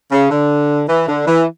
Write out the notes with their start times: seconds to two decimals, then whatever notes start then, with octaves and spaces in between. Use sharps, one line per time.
0.12 C#3
0.31 D3
0.89 E3
1.08 D3
1.27 E3